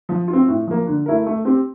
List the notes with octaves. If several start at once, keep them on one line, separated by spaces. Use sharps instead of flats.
F3
F4
C4
A2
F3 A#3
D3
A3 E4 A#4
A3
C4 G4